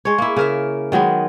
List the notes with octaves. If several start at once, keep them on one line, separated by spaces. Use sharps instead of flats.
G#3 C#5
A#3 E4
C#3 A#4 E5
D#3 F#3 G#3 B3